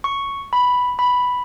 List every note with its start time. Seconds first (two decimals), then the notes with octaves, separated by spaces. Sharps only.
0.04 C#6
0.53 B5
0.99 B5